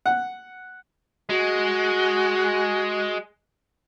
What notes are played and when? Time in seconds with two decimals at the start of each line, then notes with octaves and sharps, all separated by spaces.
0.06 F#5
1.29 G#3 F#4